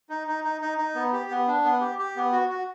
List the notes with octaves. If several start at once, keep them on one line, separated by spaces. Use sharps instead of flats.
D#4
D#4
D#4
D#4
D#4
B3
G4
B3
D4
B3
G4
G4
B3
F#4
F#4